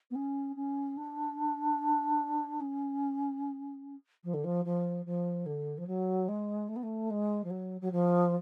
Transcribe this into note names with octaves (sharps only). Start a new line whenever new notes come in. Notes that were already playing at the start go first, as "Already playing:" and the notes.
B3
C#4
C#4
D4
C#4
F3
D3
F3
F3
F3
D3
F3
F#3
G#3
A3
B3
A3
G#3
F3
F#3
F#3
F3